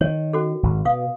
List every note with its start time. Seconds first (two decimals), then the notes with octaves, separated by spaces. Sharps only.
0.01 D#3 C#5
0.33 C#4 F#4 A4
0.63 G#1
0.85 B2 F5 D#6